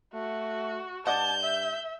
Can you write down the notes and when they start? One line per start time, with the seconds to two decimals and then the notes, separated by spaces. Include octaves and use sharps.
0.14 A3 F#4
1.07 G2 D5 D#5 F#5 A5 G6
1.41 E5